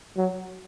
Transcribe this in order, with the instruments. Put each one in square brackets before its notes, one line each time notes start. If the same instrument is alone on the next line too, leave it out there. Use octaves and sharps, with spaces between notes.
[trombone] F#3